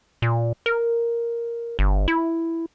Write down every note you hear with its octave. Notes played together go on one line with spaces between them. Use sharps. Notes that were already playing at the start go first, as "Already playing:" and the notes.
A#2
A#4
G1
E4